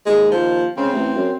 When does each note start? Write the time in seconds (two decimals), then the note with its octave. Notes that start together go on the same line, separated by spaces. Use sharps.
0.06 D#2 G#3
0.31 F3
0.77 C#3 C4
0.93 A1
1.15 F#2